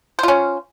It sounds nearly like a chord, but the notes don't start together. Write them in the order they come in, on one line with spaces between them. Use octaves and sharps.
C5 F4 C#4